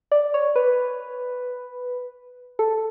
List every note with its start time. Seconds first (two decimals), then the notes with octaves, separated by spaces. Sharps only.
0.12 D5
0.34 C#5
0.56 B4
2.59 A4